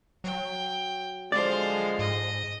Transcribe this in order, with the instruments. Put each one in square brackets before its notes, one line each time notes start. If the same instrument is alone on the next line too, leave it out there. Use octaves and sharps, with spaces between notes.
[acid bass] F#3 [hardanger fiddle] G5
[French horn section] D3 F3 G#3 [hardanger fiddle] C5 F5 [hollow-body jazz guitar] D5
[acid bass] G#2 [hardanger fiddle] D#5